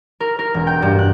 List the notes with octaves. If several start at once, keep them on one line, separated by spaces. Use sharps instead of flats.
A#4
A#4
E1
G5
G2
F#6